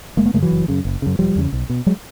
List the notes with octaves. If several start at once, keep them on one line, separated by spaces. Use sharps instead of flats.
F#1 G#3 A#3
A3 B3
F#2 C#3 G#3 A#3
E3 F#3
F#1
F#2 C#3
F#1
F#2 C#3
E1 F3 G3
E2 C#3
B1
B2
F#3 G#3